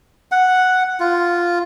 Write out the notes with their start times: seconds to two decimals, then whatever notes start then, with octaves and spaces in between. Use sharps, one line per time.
0.32 F#5
1.00 F4